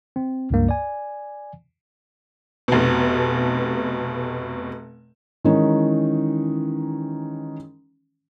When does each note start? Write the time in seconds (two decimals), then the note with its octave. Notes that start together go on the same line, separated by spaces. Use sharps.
0.16 C4
0.51 C#2 G2 A#3
0.69 D5 G#5
2.68 F1 B2
5.44 D#3 E3 G#3 C#4 D#4